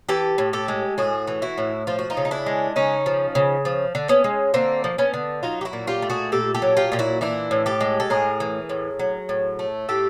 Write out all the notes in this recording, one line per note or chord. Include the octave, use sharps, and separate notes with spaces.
E3 G4 A4
A2
G4 A4
G#3
A2 F#4 G#4
E3
E4 F#4
A2
F3 F4
F#4
D#4 F4
C#3
D#4
D4 E4
G#3
C#3 C#4 D#4
F3
C#3
F3
D3
B3 C#4
G#3
D3 A#3 C4
F3
B3 C#4
D3
F#3 D#4 F4
G4
E4 F#4
A#2
F4 G4
A3
F#4 G#4
A#2 G4 A4
G4 A4
F#3
F4 G4
A#2 G4
E4 F#4
E3 D4 E4
A2
G4 A4
G#3
A4
A2 G#4 A#4
E3
A2
F#3
A2
A3
A2 G4 A4